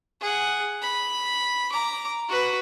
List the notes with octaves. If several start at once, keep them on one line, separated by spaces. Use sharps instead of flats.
G#4 F#5
B5
A#5 D6
F#4 B4